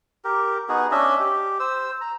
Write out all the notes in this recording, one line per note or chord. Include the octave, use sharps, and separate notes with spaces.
G4 A#4
B3 D#4 F#4 G#4
C#4 D4 D#5 E5
G4
C5 E6
A#5